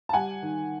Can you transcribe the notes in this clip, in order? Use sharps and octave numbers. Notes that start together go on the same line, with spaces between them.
A5
G3 F#5 G#5
D#3